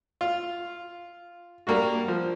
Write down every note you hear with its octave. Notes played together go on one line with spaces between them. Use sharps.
F4
G3 A#3 D4 F#4
F3